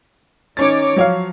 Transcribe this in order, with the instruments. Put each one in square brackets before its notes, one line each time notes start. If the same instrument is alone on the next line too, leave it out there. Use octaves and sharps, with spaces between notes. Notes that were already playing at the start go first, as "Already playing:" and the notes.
[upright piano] D#3 C#4 A6 [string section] D#4 C#5 D6
[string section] F3 [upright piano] F#3 C#5 F5